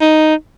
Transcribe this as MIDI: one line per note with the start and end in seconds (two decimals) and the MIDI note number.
0.01 0.34 63